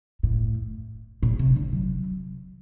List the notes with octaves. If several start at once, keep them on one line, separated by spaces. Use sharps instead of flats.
A2
A#2
C3
D3
F#3